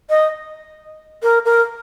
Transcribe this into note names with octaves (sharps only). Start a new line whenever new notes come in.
D#5
A#4
A#4